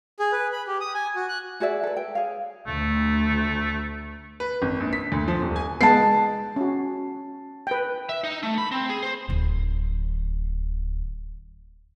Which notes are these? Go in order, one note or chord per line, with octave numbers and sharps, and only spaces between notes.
G#4
B4
B5
G4
D#6
G#5
F#4
F#6
F#4 G#4 D5 E5
A4 B4
G5
G#4 C#5 F5
D2 A3
B4
G#1
A#1
B6
D2
F3
D#1
G#5
G#3 B3 B4 A5 C7
C#4 F#4
B4 G5
E5
D#4
A3
B5
C4
G#4
C5
D1 D3